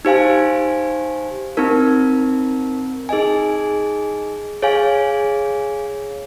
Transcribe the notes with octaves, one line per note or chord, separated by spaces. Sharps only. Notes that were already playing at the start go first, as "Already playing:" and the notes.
D#4 G4 C5 F5 G#5
C4 D#4 A#4
D#4 G#4 D#5 G#5
G#4 C#5 F5 G#5